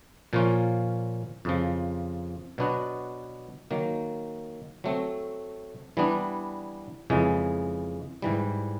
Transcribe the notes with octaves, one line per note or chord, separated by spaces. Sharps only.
A#2 F3 A#3 C#4 F4
F2 C#3 F3
B2 F#3 B3 D4 F#4
D#3 F#3 A#3
F#3 A3 C4
E3 G3 B3 D4
F2 C#3 E3 G#3
G#2 E3 G3